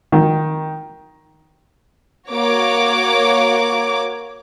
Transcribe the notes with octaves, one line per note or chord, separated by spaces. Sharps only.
D#3
A#3 F#4 C#5 D6